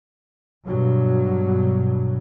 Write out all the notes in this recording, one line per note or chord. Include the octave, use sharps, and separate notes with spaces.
G2 B2 F#3